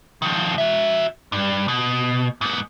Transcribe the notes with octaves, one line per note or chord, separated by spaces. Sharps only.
D#3 F3
F#4 E5
G2
B2
G#2 B3